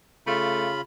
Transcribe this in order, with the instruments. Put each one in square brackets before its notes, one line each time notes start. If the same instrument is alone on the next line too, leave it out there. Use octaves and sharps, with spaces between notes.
[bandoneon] C#3 F4 B5 [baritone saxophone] A3